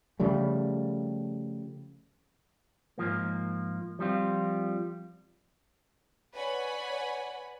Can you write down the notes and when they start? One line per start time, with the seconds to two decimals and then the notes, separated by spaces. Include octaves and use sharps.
0.20 C#3 F3 G3 A3
2.98 G#2 F3 A#3
3.99 F3 G3 C4 F4
6.34 B4 C#5 D5 F#5 G#5 B5